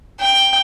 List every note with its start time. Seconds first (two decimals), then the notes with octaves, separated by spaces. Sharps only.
0.20 G5